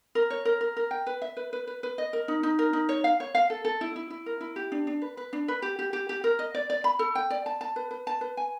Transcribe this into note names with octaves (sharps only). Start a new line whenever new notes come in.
A#4
C#5
A#4
A#4
A#4
G5
B4
E5
B4
B4
B4
B4
D#5
A#4
D#4
D#4
A#4
D#4
C#5
F5
C#5
F5
A4
A4
E4
E4
E4
A#4
E4
G4
D4
D4
B4
B4
D4
B4
G4
G4
G4
G4
A#4
D#5
D5
D5
B5
A4
G5
D5
A5
A5
B4
B4
A5
B4
G#5